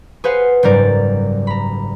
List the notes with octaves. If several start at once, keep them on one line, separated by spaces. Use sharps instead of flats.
G#4 B4 C5 F5 F#5
F#1 G#2 G3 A#4 D5
A#5 B5